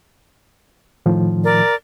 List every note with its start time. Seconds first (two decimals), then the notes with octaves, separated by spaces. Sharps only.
1.06 A2 D#3 F3
1.43 A#4 D5